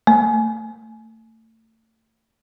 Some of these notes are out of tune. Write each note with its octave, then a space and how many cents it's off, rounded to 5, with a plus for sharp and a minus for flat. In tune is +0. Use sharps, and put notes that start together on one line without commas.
A3 +30